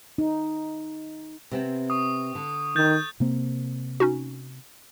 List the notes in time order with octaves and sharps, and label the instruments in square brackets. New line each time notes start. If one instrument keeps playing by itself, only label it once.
[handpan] D#4
[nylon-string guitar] C3 B3 C4
[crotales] C#6 D#6
[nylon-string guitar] D3
[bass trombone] D#3 [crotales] G6 A6
[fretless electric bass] C3 A#3 C4
[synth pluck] C#4 D#4 F#4